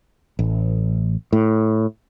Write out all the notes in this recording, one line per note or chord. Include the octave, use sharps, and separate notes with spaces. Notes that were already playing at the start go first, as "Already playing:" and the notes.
A1
A2